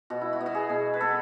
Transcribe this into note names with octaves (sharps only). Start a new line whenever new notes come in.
B2 F#4
E4
F#4
B3
F#4
G#4
B2
B4
B3 A4